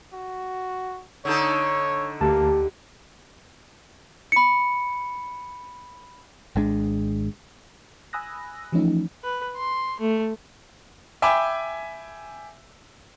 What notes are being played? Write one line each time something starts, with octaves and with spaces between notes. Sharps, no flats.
F#4
D3 D#4 A4 C#5
D2 A#3 G4 A5
B5 C#7
G#1 G#3 D4
G#5 B5 D#6 E6 F#6 A#6
E3 F3 A3 C#4 D#4
B4
C6
A3
E5 G5 G#5 B5 D6